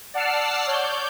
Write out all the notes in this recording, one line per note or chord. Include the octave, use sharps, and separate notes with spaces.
D5 F#5 A5 E6 F6 C7
C#5 D5 G6